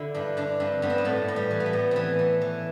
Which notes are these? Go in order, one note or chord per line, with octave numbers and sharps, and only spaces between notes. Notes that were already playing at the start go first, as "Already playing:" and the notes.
Already playing: D3 E4
G2 D4
D3 D4
G2 C4
G2 B3
C4
B3
A2 A3
A2
G3
E3
B3
A3
A2
E3 B3 C4
E3
E3